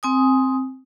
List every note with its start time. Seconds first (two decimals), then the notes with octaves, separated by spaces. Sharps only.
0.03 C4 G#5 D#6